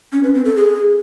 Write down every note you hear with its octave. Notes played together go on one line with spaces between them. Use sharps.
C#4
B4
C4
A4
G#4